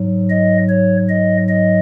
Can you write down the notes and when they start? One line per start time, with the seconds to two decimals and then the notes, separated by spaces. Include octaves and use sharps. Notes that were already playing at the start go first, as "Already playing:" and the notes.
Already playing: G#2 F#3
0.30 D#5
0.70 C#5
1.09 D#5
1.48 D#5